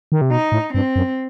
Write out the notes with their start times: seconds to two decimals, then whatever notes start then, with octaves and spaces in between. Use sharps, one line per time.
0.12 D#3
0.21 C3
0.31 B2 D#4
0.52 A2
0.73 G2 C4
0.96 F#2